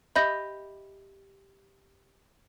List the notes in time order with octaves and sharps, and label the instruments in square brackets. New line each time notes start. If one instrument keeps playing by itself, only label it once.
[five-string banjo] G4 D#5 E5 [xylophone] B5 G6 A#6